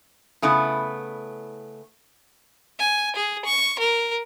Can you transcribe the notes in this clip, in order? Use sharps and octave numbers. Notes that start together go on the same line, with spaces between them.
C#3 A3 B3 E4
G#5
G#4
C#6
A#4